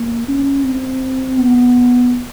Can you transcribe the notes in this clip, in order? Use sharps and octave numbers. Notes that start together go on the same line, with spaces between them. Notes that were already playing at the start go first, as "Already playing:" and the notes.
Already playing: A#3
C#4
C4
B3